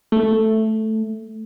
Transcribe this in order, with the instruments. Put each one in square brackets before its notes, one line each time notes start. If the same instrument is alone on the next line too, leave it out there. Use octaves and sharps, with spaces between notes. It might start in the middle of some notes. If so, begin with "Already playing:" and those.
[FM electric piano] A3